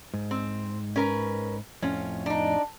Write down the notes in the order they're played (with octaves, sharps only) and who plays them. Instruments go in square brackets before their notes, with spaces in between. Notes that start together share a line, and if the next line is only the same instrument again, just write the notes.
[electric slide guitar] G#2
[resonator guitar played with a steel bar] C4
C#4 A#4 B4
[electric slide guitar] F2 A2 F4 [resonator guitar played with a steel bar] C#4
[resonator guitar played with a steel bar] D4 D#4